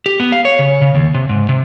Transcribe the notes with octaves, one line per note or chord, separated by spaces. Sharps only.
G4
B3
F5
C#5
C#3
C#3
D#2
C3
G#2
C3